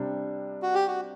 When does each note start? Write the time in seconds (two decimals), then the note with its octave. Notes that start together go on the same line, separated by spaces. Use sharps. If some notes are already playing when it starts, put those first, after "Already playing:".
Already playing: C3 G3 D4
0.62 F#4
0.75 G4
0.87 F#4